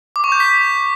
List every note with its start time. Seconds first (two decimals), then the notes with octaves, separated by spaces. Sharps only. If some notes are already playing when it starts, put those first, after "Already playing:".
0.16 D6
0.24 C#6
0.32 G6
0.40 B6